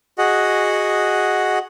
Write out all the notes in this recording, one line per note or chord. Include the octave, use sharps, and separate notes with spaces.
F#4 G#4 D#5 F#5